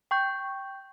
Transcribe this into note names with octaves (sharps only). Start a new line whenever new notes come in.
G5 C#6 G6